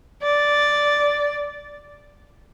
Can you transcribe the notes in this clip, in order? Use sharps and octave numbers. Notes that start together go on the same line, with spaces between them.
D5